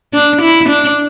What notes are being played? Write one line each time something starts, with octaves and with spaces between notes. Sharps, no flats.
D4
E4
D4